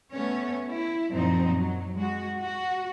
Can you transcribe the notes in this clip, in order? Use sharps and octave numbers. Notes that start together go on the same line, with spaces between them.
A3 B3 C#4 C#5
E4
F#2 A#2 F3 C4 D#4
F#3
G#3 F#4
F#4